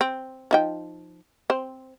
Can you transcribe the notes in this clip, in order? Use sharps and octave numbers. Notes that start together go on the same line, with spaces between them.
C4
F3 D#4 G5
C4 C5